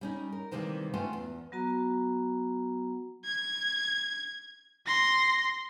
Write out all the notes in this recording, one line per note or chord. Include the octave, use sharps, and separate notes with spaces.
G3 C#4 D#4
A#4
C3 D#3 E3 G3 G#3 A#3
A3 C#4 F4 B4 F#5 G5
E2
F#3 B3 F#4 A#5
G#6
C6 A#6